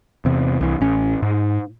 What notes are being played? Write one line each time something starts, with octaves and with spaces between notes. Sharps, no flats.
E2 C3
C2 E3
A1 C#4
G#2